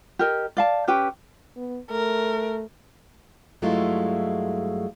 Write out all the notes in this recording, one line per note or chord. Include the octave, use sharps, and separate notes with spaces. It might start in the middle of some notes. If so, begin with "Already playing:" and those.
G4 A#4 D#5
D5 F5 A5
C#4 G4 B4 G5
B3
A3 A#4
G2 F#3 G#3 A3 E4 F4